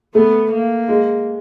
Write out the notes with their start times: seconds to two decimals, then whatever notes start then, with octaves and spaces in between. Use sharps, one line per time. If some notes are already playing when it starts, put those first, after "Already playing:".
0.14 A3 B3
0.52 A#3
0.89 G#3